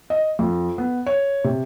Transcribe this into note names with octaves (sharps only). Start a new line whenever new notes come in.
D#5
F2
B3
C#5
C3